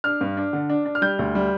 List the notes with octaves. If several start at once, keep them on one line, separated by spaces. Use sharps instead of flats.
D4 F6
G2
D4
D3
D4
D4
F6
G3 G6
D2
G3